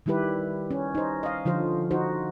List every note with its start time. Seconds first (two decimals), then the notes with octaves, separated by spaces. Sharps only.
0.06 D#3 G3 E4 G4 B4
0.71 C#4
0.95 D#4 C5
1.23 D#5 F5
1.45 D3 F3 F4 C5
1.91 D#4 F#4 C5